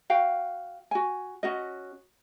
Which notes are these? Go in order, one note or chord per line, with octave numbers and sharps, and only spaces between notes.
F#4 F5 G5
F#4 G#5
C#4 F#4 D#5